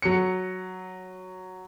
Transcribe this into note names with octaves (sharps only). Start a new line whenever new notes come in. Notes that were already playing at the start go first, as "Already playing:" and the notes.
F#3 C#7